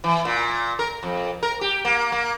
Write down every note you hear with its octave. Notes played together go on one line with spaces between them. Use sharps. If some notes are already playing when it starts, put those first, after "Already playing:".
E3
A#2
A#4
F2
A#4
G4
A#3
A#3